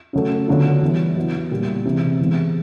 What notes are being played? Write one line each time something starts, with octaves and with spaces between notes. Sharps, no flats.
C#3 F#3 A3
D3 F#3 B3 D4 F4
E3 G3 B3 E4
F#3 B3 E4
A#2 G3 A#3
C3 E3 G#3
E3 G#3 B3